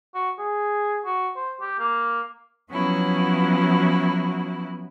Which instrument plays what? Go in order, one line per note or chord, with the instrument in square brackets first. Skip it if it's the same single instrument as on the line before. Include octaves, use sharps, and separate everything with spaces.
[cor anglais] F#4
G#4
F#4
C5
G4
A#3
[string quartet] F3 F#3 B3 C#4 E4 F#4